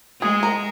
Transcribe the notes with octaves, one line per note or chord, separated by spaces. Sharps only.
G#3 G#4
A#4